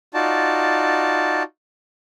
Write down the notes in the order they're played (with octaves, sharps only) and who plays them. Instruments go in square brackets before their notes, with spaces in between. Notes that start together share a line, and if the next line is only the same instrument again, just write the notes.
[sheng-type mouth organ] D#4 F4 F#4 D5 A5